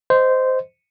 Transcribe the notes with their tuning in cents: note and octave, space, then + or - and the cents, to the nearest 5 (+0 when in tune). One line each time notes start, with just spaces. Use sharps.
C5 -15 D#5 +0